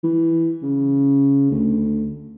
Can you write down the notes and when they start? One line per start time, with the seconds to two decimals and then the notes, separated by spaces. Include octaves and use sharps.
0.03 E3
0.63 C#3
1.51 D2